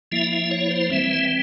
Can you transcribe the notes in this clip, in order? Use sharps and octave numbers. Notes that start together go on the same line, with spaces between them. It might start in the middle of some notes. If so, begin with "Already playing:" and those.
F3 A#3 E4 E5
E5
C#5
C5
E3 G3 C4 E5